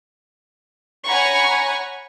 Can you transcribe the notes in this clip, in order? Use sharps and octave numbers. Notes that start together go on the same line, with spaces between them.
C#5 F#5 G#5 A#5 B5 C#6